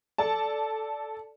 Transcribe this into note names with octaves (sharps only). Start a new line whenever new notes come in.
A4 D5 A5